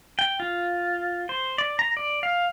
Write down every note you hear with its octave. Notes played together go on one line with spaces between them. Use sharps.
G5
F4
C5
D5
A#5
D5
F5